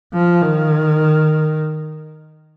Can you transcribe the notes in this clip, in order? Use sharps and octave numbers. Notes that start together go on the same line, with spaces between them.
F3
D#3